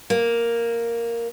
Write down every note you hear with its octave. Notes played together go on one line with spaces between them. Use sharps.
A#3